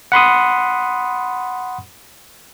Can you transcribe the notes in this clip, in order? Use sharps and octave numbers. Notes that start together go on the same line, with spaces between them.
F#5 B5 C6 D#6